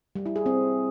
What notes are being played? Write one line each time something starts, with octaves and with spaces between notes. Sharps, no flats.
G3
E4
G#4
C4